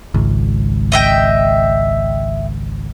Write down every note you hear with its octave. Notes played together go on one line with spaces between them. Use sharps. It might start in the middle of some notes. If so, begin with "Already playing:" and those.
G#1 C#2
D#5 E5 G5